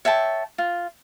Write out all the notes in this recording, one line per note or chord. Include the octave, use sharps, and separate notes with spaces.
C#5 E5 G5 A5
F4